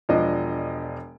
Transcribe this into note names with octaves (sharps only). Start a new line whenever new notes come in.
E1 F3 D4 D#5